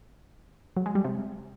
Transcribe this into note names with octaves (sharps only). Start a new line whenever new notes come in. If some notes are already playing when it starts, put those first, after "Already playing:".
F#3
G#3
G3
C3